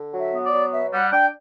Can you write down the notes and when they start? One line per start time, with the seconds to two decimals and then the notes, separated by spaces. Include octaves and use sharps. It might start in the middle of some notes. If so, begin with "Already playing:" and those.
Already playing: D3
0.13 F#3
0.19 E5
0.32 B3
0.45 D5
0.52 F#3
0.72 B2 E5
0.92 G3 F#5
1.12 D4 G5